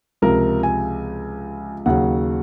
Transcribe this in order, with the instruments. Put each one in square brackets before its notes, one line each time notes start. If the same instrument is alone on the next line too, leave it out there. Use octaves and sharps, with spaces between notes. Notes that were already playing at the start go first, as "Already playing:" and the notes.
[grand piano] C#2 C3 F3 A#4
G#5
D#2 C#3 F#3 F#5